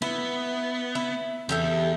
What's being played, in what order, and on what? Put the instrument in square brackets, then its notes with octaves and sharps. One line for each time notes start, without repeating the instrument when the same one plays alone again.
[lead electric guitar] B3 [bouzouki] E4
[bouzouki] E4
[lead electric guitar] E2 [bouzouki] G4 A4 E5